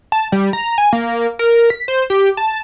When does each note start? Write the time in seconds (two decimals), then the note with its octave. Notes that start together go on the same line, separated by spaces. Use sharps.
0.12 A5
0.32 G3
0.53 A#5
0.78 G#5
0.93 A#3
1.39 A#4
1.70 B6
1.88 C5
2.10 G4
2.37 A5